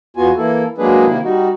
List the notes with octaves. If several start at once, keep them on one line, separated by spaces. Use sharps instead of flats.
E2 B3 F4 F#4 G#5
E3 A#3 E4 A4
F#3 G#3 A#3 D4 G#4 B4
C3 D#3 A#3 E4
G3 D#4 F#4